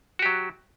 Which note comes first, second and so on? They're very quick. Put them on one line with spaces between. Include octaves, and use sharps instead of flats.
F#4 G4 F#3